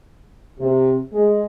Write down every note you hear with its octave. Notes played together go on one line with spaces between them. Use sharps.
C3
G#3